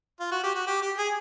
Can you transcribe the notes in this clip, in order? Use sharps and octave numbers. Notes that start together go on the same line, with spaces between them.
F4
F#4
G4
F#4
G4
G4
G#4